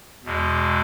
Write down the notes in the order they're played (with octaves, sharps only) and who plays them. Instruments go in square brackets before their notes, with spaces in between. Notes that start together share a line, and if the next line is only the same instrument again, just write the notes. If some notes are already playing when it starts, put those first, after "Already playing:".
[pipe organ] E2 B2 G#3